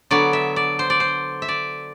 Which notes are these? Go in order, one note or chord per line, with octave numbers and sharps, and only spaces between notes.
D3 F#3 B3 D5
E5
D5
C5
D5
C5
E5
D5